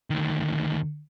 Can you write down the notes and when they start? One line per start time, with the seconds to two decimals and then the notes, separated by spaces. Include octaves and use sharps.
0.10 D2 D#3